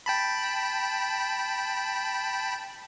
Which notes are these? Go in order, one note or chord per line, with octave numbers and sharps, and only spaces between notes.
G5 A5 B5